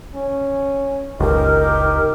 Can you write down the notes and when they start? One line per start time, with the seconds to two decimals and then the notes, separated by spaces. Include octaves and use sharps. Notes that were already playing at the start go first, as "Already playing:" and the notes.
0.14 C#4
1.20 F#1 C#2 D#4 G4 A#4